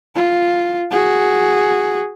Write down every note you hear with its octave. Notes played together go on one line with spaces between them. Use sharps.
F4
F#4 G#4